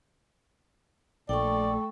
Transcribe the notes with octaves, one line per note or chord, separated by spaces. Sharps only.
A#1 A3 A4 D5 G5 C#6